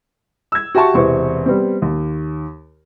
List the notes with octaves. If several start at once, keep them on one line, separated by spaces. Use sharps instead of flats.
E6 G#6
F#4 G4 E5 G5 A5 C#6
E1 C3 E3 C4 C5 C#6
G3 B3 C4
D#2